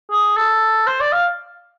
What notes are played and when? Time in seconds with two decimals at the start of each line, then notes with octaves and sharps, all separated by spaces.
0.11 G#4
0.37 A4
0.87 C5
1.00 D5
1.13 F5